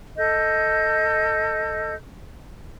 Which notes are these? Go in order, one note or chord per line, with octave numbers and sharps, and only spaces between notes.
A4 D#5 G6